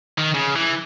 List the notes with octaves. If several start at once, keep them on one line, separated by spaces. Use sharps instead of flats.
D#3
C#3
E3